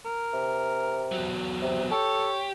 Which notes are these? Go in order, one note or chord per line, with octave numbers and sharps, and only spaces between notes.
A#4
C3
E2 F#3
C3
G4 A4 C#5